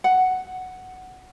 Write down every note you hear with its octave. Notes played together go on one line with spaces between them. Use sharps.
F#5